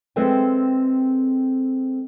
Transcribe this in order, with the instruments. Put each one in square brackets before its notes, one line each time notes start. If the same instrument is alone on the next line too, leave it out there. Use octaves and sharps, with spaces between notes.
[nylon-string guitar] G#3 C4 A4 B4 E5 G5